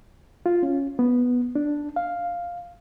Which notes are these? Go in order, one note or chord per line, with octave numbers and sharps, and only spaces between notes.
F4
C#4
B3
D4
F5